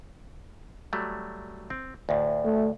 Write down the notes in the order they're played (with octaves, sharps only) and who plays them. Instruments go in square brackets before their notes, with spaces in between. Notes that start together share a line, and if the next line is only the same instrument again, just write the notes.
[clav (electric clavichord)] F#3 G3 A3
C4
D2 A2
[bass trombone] A3